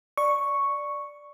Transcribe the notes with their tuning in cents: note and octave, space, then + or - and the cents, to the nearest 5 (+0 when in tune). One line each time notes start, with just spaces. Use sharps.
D5 +0 C#6 +0